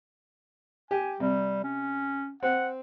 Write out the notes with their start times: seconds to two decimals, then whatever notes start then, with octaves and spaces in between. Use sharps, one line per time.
0.91 G4 G#5
1.20 C3 G3
1.64 C#4
2.43 C4 F#5